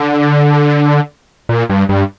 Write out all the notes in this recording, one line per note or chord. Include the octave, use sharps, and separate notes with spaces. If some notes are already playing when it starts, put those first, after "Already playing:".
Already playing: D3
A#2
G2
G2